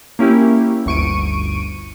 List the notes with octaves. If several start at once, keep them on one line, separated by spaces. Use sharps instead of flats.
A#3 C#4 E4 G4
G1 D2 C#6 D7 D#7